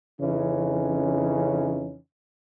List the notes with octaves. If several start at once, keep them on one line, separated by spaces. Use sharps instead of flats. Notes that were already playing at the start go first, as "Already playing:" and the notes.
F2 C#3 E3 C#4 D#4